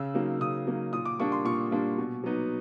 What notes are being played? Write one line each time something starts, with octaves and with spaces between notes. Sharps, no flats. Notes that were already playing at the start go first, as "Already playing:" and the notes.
Already playing: C#3 E6
F#3 A#3 D#4
C#3 D#6
F#3 A#3 D#4
A#2 D#6
D6
G3 A#3 D4 C#6
C6
A#2 C#6
G3 A#3 D4
B2
F#3 B3 D#4